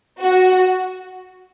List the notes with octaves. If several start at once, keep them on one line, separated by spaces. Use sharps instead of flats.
F#4